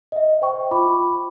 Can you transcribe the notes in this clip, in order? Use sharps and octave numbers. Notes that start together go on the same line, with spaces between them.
D#5 E5
C5 G5 C#6
F4 B5 D6